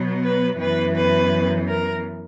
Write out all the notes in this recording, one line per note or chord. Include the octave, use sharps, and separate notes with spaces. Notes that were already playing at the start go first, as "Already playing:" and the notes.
Already playing: B2 F#3 B3
B4
F#2 E3 B3 B4
B4
A#4